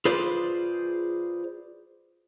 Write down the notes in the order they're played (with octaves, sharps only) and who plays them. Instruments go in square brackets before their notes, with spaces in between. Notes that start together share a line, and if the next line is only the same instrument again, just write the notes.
[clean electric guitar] F4 G#4 B4 C5 D5